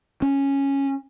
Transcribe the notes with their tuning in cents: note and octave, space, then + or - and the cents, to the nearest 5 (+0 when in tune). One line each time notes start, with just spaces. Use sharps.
C#4 -5